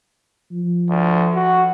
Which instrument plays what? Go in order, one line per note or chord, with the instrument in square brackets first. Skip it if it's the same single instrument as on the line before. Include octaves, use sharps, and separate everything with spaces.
[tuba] F3
[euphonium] D2
F#4